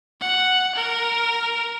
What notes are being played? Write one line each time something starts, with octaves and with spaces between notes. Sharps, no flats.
F#5
A#4